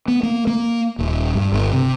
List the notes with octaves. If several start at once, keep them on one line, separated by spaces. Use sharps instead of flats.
B3
A#3
A#3
D#1
G2
G1
C3